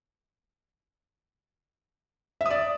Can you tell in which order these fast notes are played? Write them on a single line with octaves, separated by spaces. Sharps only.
E5 D#6 D5